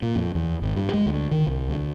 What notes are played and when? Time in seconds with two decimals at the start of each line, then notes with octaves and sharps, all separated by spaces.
0.02 A#2
0.16 F2
0.35 E2
0.62 G#1
0.76 G2
0.93 G#3
1.06 D2
1.31 D#3
1.47 C2
1.68 D2